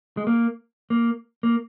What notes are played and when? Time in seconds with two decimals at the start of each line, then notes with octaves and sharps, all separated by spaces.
0.17 G#3
0.27 A#3
0.90 A#3
1.43 A#3